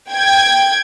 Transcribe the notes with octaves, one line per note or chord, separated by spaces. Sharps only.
G5 G#6